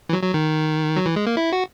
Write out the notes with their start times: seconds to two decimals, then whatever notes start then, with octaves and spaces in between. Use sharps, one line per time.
0.09 E3
0.13 F#3
0.23 F#3
0.34 D#3
0.96 F#3
1.06 E3
1.16 G#3
1.27 A#3
1.37 E4
1.53 F#4